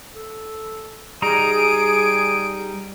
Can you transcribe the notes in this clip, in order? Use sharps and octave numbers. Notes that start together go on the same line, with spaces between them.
A4
G3 D#4 G#4 A#5 D#6 D7